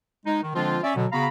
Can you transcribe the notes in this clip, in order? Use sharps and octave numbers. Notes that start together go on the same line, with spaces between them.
G#3 D#4
D#3
D3 F3 G#3 C4 D4 F4
C#4 D5 E5
B2 D3 F#3
C#3 B3 F#4 F5 A#5 B5